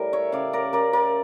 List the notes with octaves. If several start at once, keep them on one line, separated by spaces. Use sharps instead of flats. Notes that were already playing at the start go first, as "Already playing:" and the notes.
Already playing: A2 G3 A#4
C#5 E5
C#3 D5 F5
A#4 D5
C#3 A#4 D5
A#4 D5